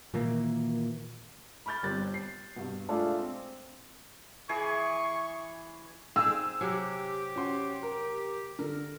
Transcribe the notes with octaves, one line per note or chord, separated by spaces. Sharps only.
A#2 D#3 E3 A#3
B5 C#6 F6 G6 A6
G1 G3 C4 F#6 A6
C7
G2 B2
G#3 A3 D4 F4 D5 F5
C4
E3 G#4 C#6
C4 D#4 G#4 E6
C3 F#3 G4 G#4
C#4 F#4 C6
A#4
D3 A#4